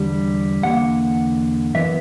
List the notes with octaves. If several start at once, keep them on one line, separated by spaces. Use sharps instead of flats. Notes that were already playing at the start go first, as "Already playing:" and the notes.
Already playing: E2 D3 G3
E2 D3 A#3 F#5
F#2 E3 B3 E5